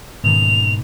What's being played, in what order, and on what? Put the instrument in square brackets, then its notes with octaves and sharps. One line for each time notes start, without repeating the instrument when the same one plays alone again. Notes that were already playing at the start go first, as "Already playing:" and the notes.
[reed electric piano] G#2 [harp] B2 D#3 A#3 [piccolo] F7